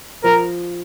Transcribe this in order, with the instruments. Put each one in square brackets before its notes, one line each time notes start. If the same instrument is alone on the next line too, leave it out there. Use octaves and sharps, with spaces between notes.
[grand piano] F3 [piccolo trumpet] A#4